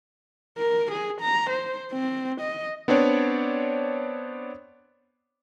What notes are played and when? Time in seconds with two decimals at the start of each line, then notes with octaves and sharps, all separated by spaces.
0.58 A#4
0.91 G#4
1.21 A#5
1.50 C5
1.92 C4
2.41 D#5
2.88 B3 C4 D4 C#5 D5